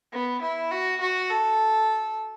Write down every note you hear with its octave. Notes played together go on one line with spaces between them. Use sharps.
B3
E4
F#4
F#4
A4